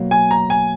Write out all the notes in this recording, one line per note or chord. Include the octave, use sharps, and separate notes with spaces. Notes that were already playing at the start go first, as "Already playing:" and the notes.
Already playing: B2 F#3 A#3
G#5
A#5
G#5